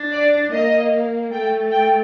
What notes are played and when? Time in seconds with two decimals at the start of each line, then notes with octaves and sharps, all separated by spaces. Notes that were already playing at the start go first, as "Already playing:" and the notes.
Already playing: D4
0.12 D5
0.52 A#3 D#5
1.32 A3 G5
1.72 G5